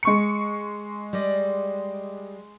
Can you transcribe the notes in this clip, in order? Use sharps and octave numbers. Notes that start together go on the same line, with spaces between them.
G#3 C#6 C#7
G3 D5 D#5